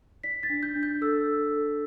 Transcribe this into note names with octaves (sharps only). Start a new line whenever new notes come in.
D5 B6
A6
D4
G6
D4
G6
A4 E6
A4
A4